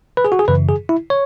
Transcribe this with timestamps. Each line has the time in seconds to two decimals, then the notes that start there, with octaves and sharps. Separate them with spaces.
0.17 B4
0.25 G#4
0.32 F#4
0.39 G#4
0.48 F#2 C#3 E3 B4
0.69 G#4
0.89 E4
1.10 C#5